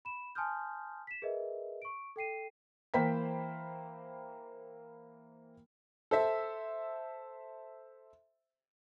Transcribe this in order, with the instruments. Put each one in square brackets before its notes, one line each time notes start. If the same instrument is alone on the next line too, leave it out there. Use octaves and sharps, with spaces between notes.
[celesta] B5 E7
G#5 A5 C6 D#6 F6 G6
B6 E7
G#4 A#4 B4 D#5 E5
C#6 D7
A4 G5 C7 D#7
[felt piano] E3 A#3 C5 G5 B5 B6
[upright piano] A4 C5 E5